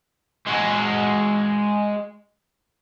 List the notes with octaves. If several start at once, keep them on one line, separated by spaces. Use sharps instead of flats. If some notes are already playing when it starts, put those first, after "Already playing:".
G#3 F#4